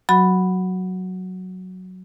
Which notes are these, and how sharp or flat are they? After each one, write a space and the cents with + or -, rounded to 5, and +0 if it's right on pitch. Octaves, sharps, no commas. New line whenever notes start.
F#3 +0 F#4 +0 B5 +0